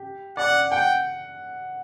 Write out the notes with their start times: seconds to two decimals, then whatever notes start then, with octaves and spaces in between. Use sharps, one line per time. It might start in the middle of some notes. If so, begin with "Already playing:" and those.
Already playing: G4
0.37 D5 F#5
0.71 F#5 G5